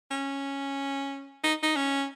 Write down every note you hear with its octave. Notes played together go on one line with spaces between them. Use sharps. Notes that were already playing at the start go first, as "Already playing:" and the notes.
C#4
D#4
D#4
C#4